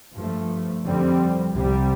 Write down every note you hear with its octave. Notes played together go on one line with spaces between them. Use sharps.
G2 F3 A3
F2 D3 G3 C4
C2 C3 G3